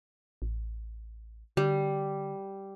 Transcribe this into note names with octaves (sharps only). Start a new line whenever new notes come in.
A1
D3 G3